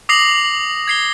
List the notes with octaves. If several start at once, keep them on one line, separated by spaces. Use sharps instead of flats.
D6 D#6 A#6 C7 F7 F#7
G#6 C7 G7